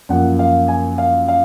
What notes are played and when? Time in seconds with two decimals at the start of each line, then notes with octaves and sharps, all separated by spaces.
0.09 F#2 F3 A#3 F#5
0.39 F5
0.68 G#5
0.98 F5
1.28 F5